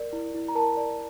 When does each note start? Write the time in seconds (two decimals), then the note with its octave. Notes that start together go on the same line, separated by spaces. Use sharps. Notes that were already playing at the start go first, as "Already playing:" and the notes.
Already playing: A#4 D5
0.13 E4
0.34 E4
0.48 A#5
0.55 A#4 A5
0.77 D5